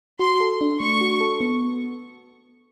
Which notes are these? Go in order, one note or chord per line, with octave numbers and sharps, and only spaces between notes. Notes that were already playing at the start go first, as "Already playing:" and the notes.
F#4 C6
A4
D4
A3 C#6
F#4
A4
B3